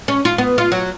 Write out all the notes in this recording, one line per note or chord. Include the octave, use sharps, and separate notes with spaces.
C#4
F4
B3
F4
F#3